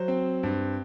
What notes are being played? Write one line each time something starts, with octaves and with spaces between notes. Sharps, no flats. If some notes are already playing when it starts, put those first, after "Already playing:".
Already playing: F#3 C5
C4
G2